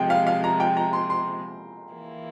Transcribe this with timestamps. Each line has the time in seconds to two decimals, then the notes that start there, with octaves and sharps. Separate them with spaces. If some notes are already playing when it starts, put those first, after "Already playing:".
Already playing: C3 F3 G#3 G5
0.10 F5
0.27 F5
0.44 A#5
0.60 G5
0.77 A#5
0.93 C6
1.10 C6
1.93 E3 A#3 E4